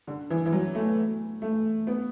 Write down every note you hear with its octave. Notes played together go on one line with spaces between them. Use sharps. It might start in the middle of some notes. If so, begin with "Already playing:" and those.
D3
E3
E3
F#3
A3
A3
B3